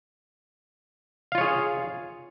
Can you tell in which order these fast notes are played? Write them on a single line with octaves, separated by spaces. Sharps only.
F5 F4 C#5 G#4